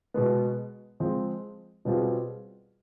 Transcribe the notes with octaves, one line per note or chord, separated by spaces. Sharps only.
B2 G#3 B3
F3 G#3 C4
B2 G3 C4 F4 G#4